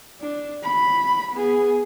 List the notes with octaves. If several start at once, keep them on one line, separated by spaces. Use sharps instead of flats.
D4
B5
B3 G#4